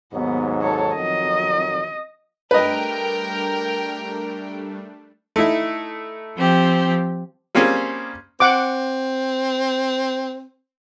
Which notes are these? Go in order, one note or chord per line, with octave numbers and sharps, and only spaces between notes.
D#2 G#2 F#3 B3
A4 C#5
F2 D#3 F#3 D#5
G3 A3 D4 A#4 B4 D#5 G5
A3 D#4 E4
F3 C4 G4
G3 A#3 C4 C#4 G#4
C4 F#5 D6